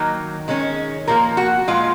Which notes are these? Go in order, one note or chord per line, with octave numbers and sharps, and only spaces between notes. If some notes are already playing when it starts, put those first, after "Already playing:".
Already playing: D#3 F#3 A#3 D#4
D#3 G#3 C#4
A#2 F3 A#3 A#4
F#4
A#2 F3 G#3 F4